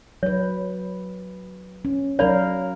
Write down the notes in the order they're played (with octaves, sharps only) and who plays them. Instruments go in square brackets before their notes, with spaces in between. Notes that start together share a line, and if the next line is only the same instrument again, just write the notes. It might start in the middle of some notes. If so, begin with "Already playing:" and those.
[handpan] F#3 B4 [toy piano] C#5
[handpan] C#4
[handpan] F#3 A#4 F5 [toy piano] C#5 D5 B5